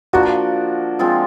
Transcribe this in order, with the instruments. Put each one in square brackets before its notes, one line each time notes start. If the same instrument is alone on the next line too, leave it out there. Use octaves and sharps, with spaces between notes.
[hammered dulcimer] F3 A#3 D4 [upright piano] F#4
[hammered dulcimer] F3 G#3 C4 F4